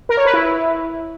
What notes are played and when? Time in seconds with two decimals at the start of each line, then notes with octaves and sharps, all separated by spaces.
0.09 A#4
0.17 C#5
0.25 B4
0.34 E4